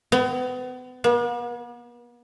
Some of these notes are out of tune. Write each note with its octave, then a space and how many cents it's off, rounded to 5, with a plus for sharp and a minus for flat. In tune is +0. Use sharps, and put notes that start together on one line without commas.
B3 +35
B3 -45